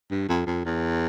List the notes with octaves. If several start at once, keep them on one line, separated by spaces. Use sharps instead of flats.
G2
F2
F2
E2